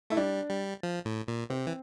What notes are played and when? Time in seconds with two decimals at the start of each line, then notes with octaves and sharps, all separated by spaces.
0.10 A3 E4
0.17 G3 D4
0.50 G3
0.83 F3
1.05 A2
1.28 A#2
1.50 C3 C4
1.67 E3